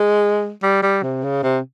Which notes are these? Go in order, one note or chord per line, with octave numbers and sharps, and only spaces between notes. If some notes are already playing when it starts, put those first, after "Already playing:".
Already playing: G#3
G3
G3
C3
C#3
C3